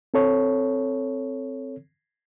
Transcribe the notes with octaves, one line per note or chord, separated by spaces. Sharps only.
C4 A4 C#5